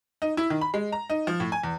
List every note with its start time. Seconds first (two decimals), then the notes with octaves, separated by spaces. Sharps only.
0.22 D#4
0.37 E4
0.50 D#3
0.61 B5
0.74 G#3
0.92 A#5
1.10 D#4
1.27 F3
1.40 A2
1.52 G#5
1.64 E2